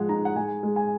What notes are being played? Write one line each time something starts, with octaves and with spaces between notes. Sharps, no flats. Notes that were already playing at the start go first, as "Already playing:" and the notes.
Already playing: F3 G#3 F#5
D#4 A#5
F#5
G#3 G#5
G#3
G#5